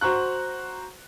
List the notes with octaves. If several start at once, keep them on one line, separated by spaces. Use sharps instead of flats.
F#4 C5 A#5 C#6 F#6